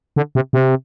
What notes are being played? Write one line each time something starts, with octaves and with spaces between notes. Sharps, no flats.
D3
C3
C3